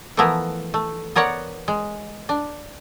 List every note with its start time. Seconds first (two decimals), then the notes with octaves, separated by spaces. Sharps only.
0.17 E3 F3 A3 B3 E4 A#4
0.74 A3
1.16 B3 A#4 C#5 D5 F#5
1.68 G#3
2.29 D4